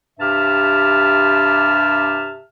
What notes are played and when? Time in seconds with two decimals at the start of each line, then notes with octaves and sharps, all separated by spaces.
0.19 G2 C3 G4 E5 A5 F6